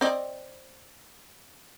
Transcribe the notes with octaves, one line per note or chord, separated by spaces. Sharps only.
C4 D5 D#5